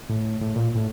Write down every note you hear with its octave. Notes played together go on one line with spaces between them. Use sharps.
A2
A2
A#2
A2